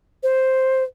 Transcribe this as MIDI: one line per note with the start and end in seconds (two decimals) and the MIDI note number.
0.23 0.84 72